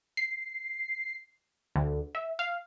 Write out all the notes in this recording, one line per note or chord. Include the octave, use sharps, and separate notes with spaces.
C7
D2
E5
F5